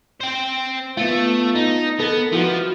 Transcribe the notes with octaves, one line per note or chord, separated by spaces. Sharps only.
C5 G5
A3 B3 F4
D#4
B3 A4 A#4
F3 E4 F#4 B4